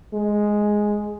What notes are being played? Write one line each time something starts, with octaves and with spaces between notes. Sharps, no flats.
G#3